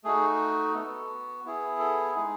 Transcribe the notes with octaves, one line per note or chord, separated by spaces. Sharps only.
A3 D#4 F#4 G#4
B3 F#4 A4
B3 E4 G#4
A4
G#3 D#4 G#4